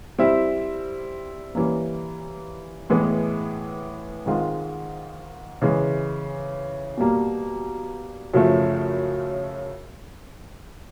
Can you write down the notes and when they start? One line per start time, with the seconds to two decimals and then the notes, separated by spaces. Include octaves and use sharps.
0.18 G3 C4 E4
1.55 E3 G3 A#3 C#4
2.90 A2 E3 G#3 B3
4.26 G#2 D#3 G#3 C4 F4
5.62 C#3 E3 G#3
6.97 B2 G3 A#3
8.34 F#2 C#3 F3 A3